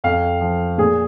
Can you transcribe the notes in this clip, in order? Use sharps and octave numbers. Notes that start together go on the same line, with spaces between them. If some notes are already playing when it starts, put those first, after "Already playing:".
F2 F5
F3
A#2 G#4